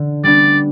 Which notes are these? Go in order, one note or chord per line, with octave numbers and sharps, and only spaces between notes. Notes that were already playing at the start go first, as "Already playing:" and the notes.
Already playing: D3
G3 B3 D4 D5